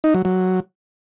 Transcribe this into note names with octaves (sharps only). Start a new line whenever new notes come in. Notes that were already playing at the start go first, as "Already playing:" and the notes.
D#4
F#3
F#3